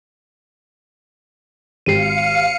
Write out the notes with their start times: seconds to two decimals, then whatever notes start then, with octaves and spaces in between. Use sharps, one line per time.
1.86 G#1 G4 F5 C7 C#7 D#7